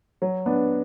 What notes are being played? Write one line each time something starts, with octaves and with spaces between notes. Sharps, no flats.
F#3
B3 D4